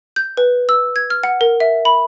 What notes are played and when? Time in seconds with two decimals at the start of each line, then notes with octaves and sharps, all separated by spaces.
0.16 G6
0.37 B4
0.69 E6
0.96 G#6
1.10 F6
1.23 F#5
1.41 A#4
1.60 E5
1.85 B5